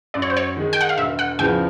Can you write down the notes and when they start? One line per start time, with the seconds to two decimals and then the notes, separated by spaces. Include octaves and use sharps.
0.14 F#2 D5
0.22 C#5
0.30 C5
0.37 C#5
0.57 D#3 G#3
0.73 G5
0.81 F#5
0.89 F5
0.98 E1 E5
1.19 F#5
1.39 E2 C#3 F3 G5